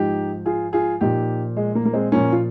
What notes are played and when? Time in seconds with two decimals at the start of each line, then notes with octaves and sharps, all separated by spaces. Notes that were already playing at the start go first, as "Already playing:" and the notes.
Already playing: G#2 F3 D#4 G4
0.46 F4 G#4
0.73 F4 G#4
1.01 A#2 F3 D#4 G4
1.57 G#3
1.75 A#3
1.85 A#3
1.93 G#3 C4
2.12 A#2 F3 A#3 C#4
2.32 F4